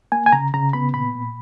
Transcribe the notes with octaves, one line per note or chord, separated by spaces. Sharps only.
A#3 G#5
G#5
C#3 A#5
C#3 A#5
B3 B5
A#2 B5
A#2